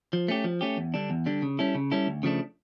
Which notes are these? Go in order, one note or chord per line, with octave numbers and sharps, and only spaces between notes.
F3
A3 C#4 G4
F3
A3 C#4 G4
E2
D3 G3 D4
E2
D3 G3 D4
C#3
G3 C#4 E4 A4
C#3
G3 C#4 E4 A4
D2
C#3 F3 A3 D4